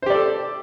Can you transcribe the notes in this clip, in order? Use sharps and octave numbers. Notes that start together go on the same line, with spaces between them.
G4 A4 C5 D5